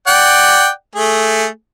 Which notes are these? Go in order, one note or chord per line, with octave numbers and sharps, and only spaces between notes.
D5 F#5 G5
A3 G#4